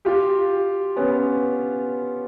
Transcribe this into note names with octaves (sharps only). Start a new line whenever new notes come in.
F4 G4
B3 C#4